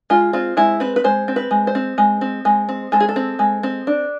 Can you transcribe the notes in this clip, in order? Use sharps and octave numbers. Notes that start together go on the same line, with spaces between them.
G#3 F4
C4 F4
G#3 E4
C4 B4
B4
G#3 C5
C4
B4
G#3
C5
C4
G#3
C4
G#3
C4
G#3 A4
G#4
A4
C4
G#3
C4
D4